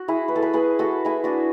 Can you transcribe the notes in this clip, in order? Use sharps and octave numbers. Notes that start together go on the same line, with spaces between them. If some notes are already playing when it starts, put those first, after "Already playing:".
Already playing: F#4
E4 G#4
B4
A4
G#4 B4
G#4 B4
F#4 A4
E4 G#4
D4 F#4